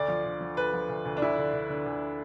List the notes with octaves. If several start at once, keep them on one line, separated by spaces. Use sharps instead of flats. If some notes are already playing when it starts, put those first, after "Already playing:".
Already playing: D2 D5
F3
D3
F3
D2 B4
F3
D2
D2
D4
D2 E4
D3
D3
D3
D2